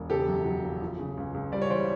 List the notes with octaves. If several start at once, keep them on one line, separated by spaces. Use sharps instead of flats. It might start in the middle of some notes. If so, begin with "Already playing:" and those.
Already playing: E1
C#3 G4 A4
F#2
F#3
F#1
F3
C#3
C#2
C#2
G3 D5
C#5
E3 C5 D5